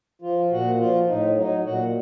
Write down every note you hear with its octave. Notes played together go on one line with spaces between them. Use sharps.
F3 F4
A#2 F#4
F3 F4
A2 D#4
F#3 D#4
A#2 F#4